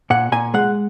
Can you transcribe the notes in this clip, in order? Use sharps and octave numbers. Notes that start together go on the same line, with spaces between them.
A#2 F#5
A#2 G#5
G#3 F#5